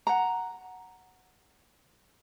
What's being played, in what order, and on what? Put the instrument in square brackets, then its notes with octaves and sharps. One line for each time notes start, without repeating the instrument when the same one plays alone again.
[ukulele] F#5 A#5